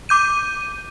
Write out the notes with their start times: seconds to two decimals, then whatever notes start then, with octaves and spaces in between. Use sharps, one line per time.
0.09 D6 G6 D#7